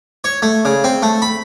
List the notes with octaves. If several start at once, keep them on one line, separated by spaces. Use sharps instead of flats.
C#5
A3
C#3
C4
A3
B5